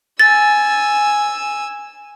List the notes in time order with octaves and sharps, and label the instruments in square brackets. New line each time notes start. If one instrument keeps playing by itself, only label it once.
[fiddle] G#5 E6 [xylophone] A6